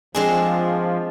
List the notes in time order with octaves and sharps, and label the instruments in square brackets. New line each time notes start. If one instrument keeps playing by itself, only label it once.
[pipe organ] F3 [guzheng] G#3 C4 D4 [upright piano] G#4